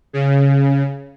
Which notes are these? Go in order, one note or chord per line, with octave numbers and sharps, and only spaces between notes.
C#3